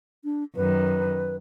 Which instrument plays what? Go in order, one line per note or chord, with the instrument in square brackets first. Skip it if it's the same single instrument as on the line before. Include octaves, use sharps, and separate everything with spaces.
[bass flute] D4
[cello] F#2 D#3 [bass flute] B4